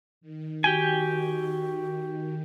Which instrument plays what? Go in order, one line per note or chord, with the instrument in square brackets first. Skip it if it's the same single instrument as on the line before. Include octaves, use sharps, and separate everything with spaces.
[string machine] D#3
[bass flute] F#4 [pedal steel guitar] G4 G5 G#5